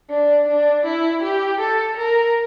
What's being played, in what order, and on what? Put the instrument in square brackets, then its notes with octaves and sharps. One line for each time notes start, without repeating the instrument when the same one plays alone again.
[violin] D4
D4
E4
G4
A4
A#4